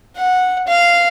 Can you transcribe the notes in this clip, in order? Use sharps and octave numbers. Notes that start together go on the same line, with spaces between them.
F#5
F5